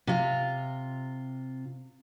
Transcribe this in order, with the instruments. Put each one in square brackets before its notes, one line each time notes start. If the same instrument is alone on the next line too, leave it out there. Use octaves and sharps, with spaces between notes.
[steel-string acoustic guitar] C3 F4